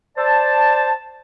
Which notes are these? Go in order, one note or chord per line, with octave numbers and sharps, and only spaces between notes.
C5 D5 A5